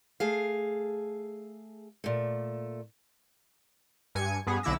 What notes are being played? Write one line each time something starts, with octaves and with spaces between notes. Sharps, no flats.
A3 G#4 F5
A#2 A3
G2 G#5 G#6 C#7
G2 B3 G#4
B1 D3 E4 D6 E6 A#6